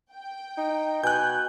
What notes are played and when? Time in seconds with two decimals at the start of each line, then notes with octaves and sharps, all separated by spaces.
0.13 G5
0.58 D#4
1.04 B2 G#5 F#6 G6